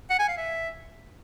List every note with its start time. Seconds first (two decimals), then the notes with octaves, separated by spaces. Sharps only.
0.10 F#5
0.19 G#5
0.28 F5
0.37 E5